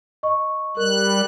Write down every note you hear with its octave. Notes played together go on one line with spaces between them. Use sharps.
D#5 C#6
G3 A#4 F#6